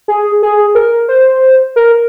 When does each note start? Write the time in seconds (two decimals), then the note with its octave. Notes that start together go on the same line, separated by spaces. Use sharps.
0.08 G#4
0.43 G#4
0.75 A#4
1.08 C5
1.76 A#4